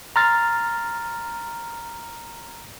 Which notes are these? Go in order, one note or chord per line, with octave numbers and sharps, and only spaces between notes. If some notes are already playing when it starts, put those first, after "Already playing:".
A#5 C6 F6 A6